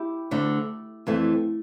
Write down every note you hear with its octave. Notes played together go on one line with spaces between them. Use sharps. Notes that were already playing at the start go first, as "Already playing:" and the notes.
Already playing: E4 G4
D2 D3 A3
F2 E3 A3